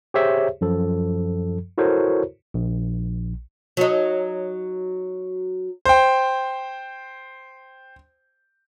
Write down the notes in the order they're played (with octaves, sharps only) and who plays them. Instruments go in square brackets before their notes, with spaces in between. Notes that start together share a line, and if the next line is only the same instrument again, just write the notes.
[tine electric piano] G4 G#4 C5 C#5 E5
F#2 F3 A4
E4 F#4 A4 A#4 C5 C#5
A#1
[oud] F#3 D#4
[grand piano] C5 G5